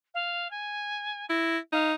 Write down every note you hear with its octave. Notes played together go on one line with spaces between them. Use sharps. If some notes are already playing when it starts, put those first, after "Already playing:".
F5
G#5
E4 A#6
D#4 F5